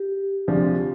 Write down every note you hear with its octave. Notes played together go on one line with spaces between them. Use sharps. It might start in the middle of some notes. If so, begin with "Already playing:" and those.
Already playing: G4
D2 C3 F3 G#3 D4